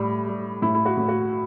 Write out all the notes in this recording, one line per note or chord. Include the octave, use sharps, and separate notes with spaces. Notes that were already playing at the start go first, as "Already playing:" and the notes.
Already playing: A2 G3
G3
A2 E4
E4
F#4
A2
F#4